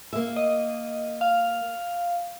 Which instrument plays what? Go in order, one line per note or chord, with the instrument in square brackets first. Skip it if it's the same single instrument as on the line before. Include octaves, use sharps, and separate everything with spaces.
[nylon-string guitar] A#3 E5
[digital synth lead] D#5
F5